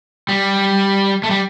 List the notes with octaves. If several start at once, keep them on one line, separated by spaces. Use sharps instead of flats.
G3
A3
G3